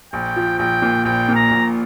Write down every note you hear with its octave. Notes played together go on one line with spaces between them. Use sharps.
A#1 G5
F3
A#1 G5
A#2
A#1 G5
A#2
A#5
A#1